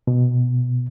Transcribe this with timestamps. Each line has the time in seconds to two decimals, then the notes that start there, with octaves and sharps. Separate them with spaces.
0.07 B2